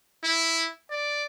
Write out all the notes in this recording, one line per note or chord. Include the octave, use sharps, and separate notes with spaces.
E4
D5